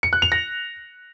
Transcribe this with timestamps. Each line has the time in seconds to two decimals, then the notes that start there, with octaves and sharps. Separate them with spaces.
0.03 C#7
0.13 F#6
0.22 F7
0.32 A#6